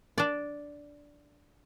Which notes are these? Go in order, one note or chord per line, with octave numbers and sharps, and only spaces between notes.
D4 D5